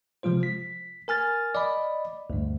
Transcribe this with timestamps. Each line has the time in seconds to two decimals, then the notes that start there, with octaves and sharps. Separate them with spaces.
0.23 C3 F3 G#3 F4 C5
0.43 B6
1.08 A#4 G#5 F6 A6
1.55 D5 D#5 B5
2.30 D2 G2